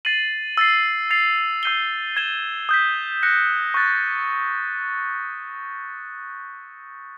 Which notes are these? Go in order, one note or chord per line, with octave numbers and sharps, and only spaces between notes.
A6 C7 D#7 F#7
E6 A6 C7
A6 C7 F7
E6 G6 C7 D#7 G7
G#6 C7 E7 G7
D#6 G6 B6
F#6 A#6 C#7
C#6 F#6 A6